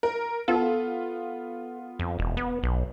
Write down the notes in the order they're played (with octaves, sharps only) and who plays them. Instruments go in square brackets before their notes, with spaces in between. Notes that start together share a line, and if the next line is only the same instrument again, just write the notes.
[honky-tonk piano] A#4
[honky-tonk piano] B3 F4 [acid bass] A4
[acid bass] F2
E1
B3
B1